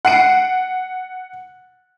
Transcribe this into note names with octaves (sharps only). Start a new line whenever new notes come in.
F#5 C7 D7